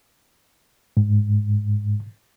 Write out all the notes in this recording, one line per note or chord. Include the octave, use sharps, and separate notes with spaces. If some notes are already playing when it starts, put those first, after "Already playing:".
G#2